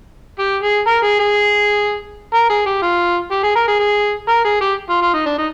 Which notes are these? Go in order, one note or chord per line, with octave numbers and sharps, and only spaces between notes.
G4
G#4
A#4
G#4
G#4
A#4
G#4
G4
F4
G4
G#4
A#4
G#4
G#4
A#4
G#4
G4
F4
F4
D#4
D4
D#4